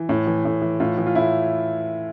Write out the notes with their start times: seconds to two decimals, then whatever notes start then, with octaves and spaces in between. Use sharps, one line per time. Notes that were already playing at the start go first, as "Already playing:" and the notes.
Already playing: E3
0.09 A2
0.27 E3
0.45 A2
0.62 E3
0.80 A2 F4
0.98 E3
1.07 F4
1.15 A2 E4